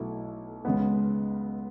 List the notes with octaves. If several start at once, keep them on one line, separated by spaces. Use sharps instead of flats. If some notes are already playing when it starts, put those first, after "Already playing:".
Already playing: B1 B2 A3 E4
C#2 C#3 G#3 B3